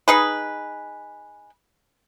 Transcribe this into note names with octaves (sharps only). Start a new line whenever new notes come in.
D#4 G#4 B4